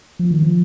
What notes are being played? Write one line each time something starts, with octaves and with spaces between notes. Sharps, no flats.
F3
D#3
F3